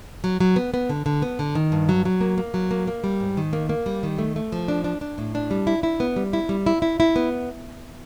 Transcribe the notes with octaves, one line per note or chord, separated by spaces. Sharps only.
F#3
F#3
B3
B3
D3
D3
B3
D3
D#3
G2
F#3
F#3
A#3
A#3
F#3
A#3
A#3
G3
G#2
D#3
A#3
A#3
G3
D#3
A3
A3
F3
D4
D4
D4
A2
D4
G3
E4
E4
B3
G3
E4
G3
E4
E4
E4
B3